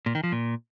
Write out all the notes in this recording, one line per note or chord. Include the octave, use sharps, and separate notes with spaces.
A#2
D#3
F3
A#2